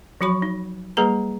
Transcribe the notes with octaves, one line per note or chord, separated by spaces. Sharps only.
F3 F#3 F#4 B5 C#6
D#4
G3 A#3 G#4 B4 A#5